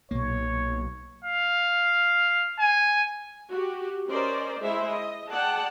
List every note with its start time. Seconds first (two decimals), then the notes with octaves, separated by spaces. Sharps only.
0.11 B1 A#2 A#3 C#5
1.24 F5
2.59 G#5
3.50 F#4 G4
4.08 C#4 A#4 C5 D5 D#5
4.60 G#3 E4 G#4 C5 E5
4.93 D#5
5.30 G#4 D5 F#5 G5 A5